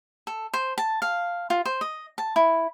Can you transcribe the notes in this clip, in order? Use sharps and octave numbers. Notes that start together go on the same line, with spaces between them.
A4
C5
A5
F5
F4
C5
D#5
A5
E4